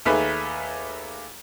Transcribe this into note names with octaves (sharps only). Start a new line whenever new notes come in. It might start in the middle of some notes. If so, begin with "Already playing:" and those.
D#2 A3 G#4 B4